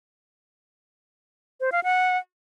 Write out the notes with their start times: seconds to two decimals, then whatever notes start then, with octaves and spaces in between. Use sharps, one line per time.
1.60 C5
1.72 F5
1.84 F#5